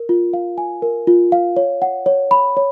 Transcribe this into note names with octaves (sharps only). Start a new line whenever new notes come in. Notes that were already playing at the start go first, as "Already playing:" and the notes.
Already playing: A#4
F4
F5
G#5
A#4
F4
F5
C#5
F#5
C#5
B5
C#5